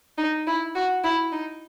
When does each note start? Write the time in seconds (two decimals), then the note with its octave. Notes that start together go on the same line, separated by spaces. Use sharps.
0.18 D#4
0.47 E4
0.75 F#4
1.04 E4
1.33 D#4